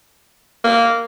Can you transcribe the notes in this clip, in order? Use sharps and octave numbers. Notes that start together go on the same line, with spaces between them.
A#3